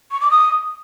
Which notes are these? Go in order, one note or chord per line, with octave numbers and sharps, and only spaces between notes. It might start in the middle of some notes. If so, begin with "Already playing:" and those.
C#6
D6
D#6